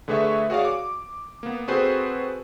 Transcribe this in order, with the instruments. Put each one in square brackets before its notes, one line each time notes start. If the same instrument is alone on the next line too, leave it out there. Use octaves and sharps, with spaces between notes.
[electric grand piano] D3 A3 G#4 B4 E5 C#6
F#4 G#4 C#5 D5 F5
D6
A#3 B3
C4 F#4 G#4 A4 B4 C5